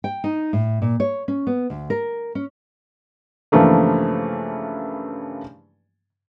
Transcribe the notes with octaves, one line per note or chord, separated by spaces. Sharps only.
G5
D#4
A2
A#2
C#5
C#4
B3
D2
A#4
C#4
G2 C#3 E3 F3 A3 A#3